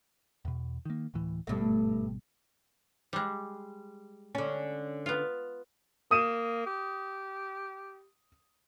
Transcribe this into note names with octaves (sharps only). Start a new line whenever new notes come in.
E2 B2
D#3 A#3
D1 A2 E3
G#1 G2 B2 G3 A3
G3 G#3
D3 C#4
B3 F4
A#3 D#6 D#7 E7
G4